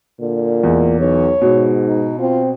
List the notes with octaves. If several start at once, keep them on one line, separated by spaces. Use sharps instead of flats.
A#2 D3
E2 G#3
B1 C#5
G#2 B2
D#4
C4 F4